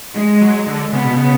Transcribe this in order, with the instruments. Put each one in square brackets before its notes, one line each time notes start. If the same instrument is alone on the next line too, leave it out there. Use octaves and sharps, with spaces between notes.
[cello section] G#3
[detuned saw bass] F#3
D3
[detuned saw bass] C#3 [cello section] B3
[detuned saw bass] B2
C#3